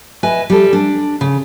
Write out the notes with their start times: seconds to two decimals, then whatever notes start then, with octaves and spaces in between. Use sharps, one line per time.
0.23 B4 D#5 E5 G#5
0.50 G3 A4
0.73 D4
1.21 C#3